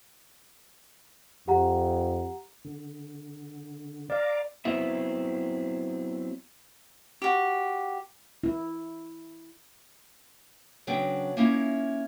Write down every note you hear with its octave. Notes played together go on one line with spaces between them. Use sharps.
F2 G4 F#5 A#5
D3
D5 F5 A#5 D6
F#3 B3 C4 E4 E5
F#4 G4
E4
C#3 F#3 B3 D4 G5
A#3 C#4 D#4 E4